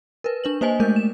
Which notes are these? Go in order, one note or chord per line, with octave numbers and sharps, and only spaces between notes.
A#4 B4
D4 B4 F#7
A#3 C5 D#5 G#5
G#3 A3 A#4 G6
E7